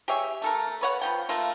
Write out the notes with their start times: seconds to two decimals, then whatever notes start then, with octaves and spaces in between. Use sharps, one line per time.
0.08 G4 G#4 C#5 E5
0.42 A3 A4 A#4
0.81 B4 C#5 F#5
1.01 F3 B3 G5
1.29 A3 A#3 F4